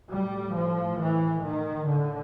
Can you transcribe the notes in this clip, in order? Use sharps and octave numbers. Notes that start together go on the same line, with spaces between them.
A2 G3
F3
E3
D#3
A2 D3